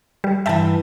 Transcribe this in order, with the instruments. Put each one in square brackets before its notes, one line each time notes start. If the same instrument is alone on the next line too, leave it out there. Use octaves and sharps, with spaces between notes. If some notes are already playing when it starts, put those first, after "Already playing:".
[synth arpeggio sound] G3
[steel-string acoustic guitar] G2 E3 [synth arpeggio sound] E5 G5 A5